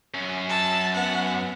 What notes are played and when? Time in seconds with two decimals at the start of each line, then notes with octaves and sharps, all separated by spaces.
0.14 F#2 C#4
0.49 A5 E6
0.94 B3 F#5